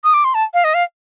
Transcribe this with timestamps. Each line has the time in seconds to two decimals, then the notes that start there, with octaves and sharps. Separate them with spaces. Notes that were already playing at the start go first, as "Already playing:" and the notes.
0.04 D#6
0.14 D6
0.24 C6
0.34 A5
0.54 F5
0.64 D#5
0.74 F5